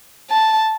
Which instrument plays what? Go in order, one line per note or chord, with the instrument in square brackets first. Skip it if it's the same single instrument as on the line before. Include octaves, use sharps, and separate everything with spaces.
[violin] A5